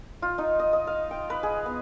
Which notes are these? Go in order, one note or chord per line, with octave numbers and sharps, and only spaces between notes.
F4
D#4
D#5
D#5
F5
G5
B4
G#4
B3